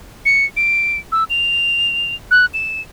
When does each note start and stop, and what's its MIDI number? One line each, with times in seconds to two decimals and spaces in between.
0.25 0.45 97
0.57 0.98 98
1.12 1.24 88
1.30 2.15 101
2.31 2.46 90
2.54 2.81 100